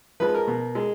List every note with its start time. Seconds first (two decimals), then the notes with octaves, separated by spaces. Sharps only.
0.20 F3 G#3 B4
0.34 A#4
0.47 B2
0.75 G#3